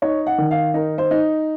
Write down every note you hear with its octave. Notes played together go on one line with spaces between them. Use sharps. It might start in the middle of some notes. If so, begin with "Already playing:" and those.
D#4 C#5
F#5
D#3
F5
D#4 A#4
C5
D#4